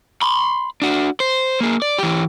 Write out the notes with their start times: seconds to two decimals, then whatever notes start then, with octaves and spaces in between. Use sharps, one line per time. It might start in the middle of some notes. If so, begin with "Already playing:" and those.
0.22 B5 C6
0.82 D4 F#4
1.20 C5
1.61 A#3 G#4
1.82 D5
1.99 E3 G4